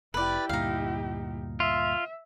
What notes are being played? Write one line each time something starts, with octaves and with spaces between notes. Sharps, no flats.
F1 E4 G4 B4 D5
D2 G2 A#2 D#4 F5
F4 E5